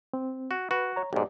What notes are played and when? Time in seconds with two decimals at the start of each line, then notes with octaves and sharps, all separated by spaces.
0.13 C4
0.51 F#4
0.71 F#4 B4
0.96 C#5 A#5
1.13 B1 G#2 G4 D5